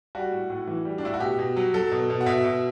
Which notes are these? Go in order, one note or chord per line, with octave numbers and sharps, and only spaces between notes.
G3 F#4
A2
A2
E3
G3
D4
A2 E4
F#4
B2 G4
B2
F#3
F#3 A4
B2
B2
F#5
B2 E5
B2